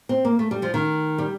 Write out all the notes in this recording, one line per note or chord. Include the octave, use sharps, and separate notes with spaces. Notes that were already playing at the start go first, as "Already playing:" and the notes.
C4
A#3
A3
G3
F3
D#3
G3